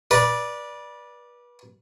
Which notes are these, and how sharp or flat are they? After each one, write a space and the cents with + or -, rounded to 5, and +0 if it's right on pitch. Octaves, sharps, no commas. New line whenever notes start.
B4 -30 D5 +0